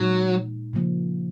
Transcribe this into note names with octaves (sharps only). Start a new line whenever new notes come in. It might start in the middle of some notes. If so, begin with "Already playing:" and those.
Already playing: A#2 F#3 G#3 D#4
C#3 F3 A#3